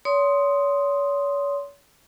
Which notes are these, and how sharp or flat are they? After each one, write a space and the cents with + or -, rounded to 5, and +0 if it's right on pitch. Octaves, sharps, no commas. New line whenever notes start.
C#5 +40 C6 +0 D#6 +0